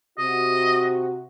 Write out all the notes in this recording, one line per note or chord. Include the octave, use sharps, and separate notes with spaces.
C3 F#4 D#5